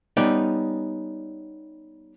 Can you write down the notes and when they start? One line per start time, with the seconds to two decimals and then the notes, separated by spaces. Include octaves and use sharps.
0.17 G3 B3 C#4 D#4 F4 D5